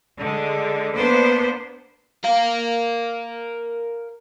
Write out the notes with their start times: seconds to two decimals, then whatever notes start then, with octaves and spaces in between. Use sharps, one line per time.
0.18 D3 G#3
0.94 A#3 B3 D4 B4 C5
2.24 A#4 F5